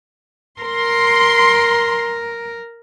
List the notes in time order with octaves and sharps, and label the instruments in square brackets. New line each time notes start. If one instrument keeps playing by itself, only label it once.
[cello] A#4 [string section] C6